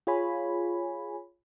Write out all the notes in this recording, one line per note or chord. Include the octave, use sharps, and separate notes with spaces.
F4 G#4 C#5 G#5 B5